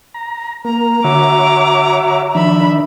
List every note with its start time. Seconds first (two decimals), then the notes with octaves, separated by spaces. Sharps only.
0.14 A#5
0.65 A#3 A#5
1.04 D3 F#4 C#5 E5 D6
2.35 D#3 F3 D4 E5 B5